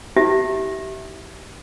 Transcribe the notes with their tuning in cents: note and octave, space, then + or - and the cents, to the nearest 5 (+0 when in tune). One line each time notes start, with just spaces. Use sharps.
E4 -40 G4 -25 E5 -10